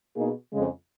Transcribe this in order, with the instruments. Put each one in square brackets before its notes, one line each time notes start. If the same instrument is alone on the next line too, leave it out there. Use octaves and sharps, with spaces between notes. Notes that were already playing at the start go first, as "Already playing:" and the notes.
[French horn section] B2 A#3 D#4 G#4
F2 C#3 G#3